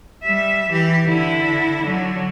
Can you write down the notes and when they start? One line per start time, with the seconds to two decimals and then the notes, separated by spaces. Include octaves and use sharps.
0.23 G3 E5
0.70 E3 G4
1.07 D3 E4
1.83 D3 F#3